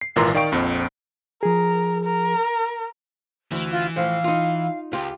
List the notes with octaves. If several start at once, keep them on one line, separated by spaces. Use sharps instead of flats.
C7
G#1 A#2 E3 A#3 A#5 C6
D#3 D5 F5 G5 C#6 D7
A#1 F2 C4
F3 G#4 A#4
A#4
D2 E3
F4
A2 F3 F5
D#4 F4
C#2 F4 G4